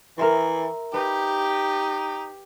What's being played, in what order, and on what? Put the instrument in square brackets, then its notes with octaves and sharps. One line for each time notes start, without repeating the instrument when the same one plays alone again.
[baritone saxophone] E3 [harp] A#4 E5 C6
[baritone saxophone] D#4 [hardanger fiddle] G4 [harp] B4